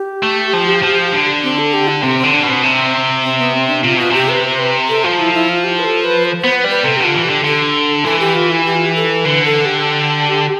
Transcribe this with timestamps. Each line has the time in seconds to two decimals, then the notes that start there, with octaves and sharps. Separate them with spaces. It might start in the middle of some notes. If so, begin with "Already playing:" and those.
Already playing: G4
0.23 A3
0.53 F3
0.83 F3
1.13 D3
1.43 C4
1.58 A4
1.74 G4
1.88 D4
2.03 C3 C4
2.18 D3 C4
2.33 D4
2.43 B2
2.48 C4
2.64 C3
3.24 C4
3.39 B3
3.54 C4
3.68 D4
3.84 C3 F4
3.98 B2 F4
4.10 C3 G4
4.29 B4
4.44 C5
4.59 B4
4.89 A4
5.04 F3 F4
5.19 E4
5.34 E4
5.49 F4
5.64 G4
5.79 B4
5.84 A4
6.04 B4
6.25 C5
6.40 B3 C5
6.54 B4
6.64 G3 B4
6.84 C3 A4
6.97 G4
7.00 D3 F4
7.15 E3
7.25 G4
7.30 D3
7.44 D3 A4
8.05 E3 A4
8.20 G4
8.35 F4
8.50 E4
8.65 G4
8.75 F4
8.86 G4
8.95 A4
9.25 D3 B4
9.45 A4
9.66 G4